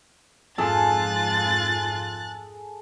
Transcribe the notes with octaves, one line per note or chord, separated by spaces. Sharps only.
F2 G#2 F4 G#4 A4 F#6 A6